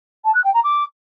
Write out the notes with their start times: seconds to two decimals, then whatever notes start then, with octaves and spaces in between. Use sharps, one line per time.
0.24 A5
0.34 F#6
0.44 G5
0.54 A#5
0.64 D6